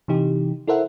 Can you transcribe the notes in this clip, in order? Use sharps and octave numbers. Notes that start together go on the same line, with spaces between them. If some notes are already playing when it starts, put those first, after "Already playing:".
C3 E3 D#4 G4
E4 A4 A#4 C5 E5 F#5